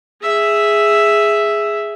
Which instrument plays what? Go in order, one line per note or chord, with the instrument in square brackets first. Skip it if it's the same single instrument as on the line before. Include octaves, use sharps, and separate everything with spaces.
[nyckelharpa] G#4 E5